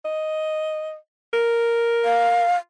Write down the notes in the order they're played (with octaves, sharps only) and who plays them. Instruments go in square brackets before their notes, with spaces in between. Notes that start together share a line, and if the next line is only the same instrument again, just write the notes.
[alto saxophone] D#5
A#4
[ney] F5